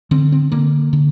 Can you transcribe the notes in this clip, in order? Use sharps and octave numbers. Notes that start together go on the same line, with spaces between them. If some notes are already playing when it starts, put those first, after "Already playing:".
D3 C4
C4
D3 A#3
D3